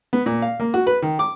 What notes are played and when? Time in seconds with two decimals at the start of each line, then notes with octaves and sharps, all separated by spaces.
0.13 B3
0.26 A#2
0.42 F5
0.60 A#3
0.74 F#4
0.87 B4
1.02 D#3
1.19 D6